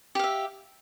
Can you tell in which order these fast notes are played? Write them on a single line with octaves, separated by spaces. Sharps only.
G4 F5 E5